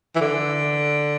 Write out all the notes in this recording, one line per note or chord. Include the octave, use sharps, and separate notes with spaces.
E3
D3